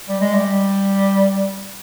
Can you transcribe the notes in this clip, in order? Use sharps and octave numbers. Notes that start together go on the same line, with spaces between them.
G3
G#3
G3